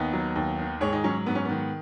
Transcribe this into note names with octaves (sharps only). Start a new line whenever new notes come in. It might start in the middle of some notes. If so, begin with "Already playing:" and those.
Already playing: D#2 B3 D#4
F#3
D#2
D#3
G#2 G#4 C#5
D#4 G#4
F#3 C#4
G#2 B3
C#4
D#3 B3